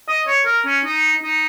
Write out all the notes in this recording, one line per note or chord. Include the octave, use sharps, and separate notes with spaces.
D#5
C#5
A#4
C#4
D#4
D#4